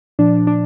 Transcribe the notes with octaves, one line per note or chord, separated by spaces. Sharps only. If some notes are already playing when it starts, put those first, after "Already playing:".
A#2 F3 D4
D4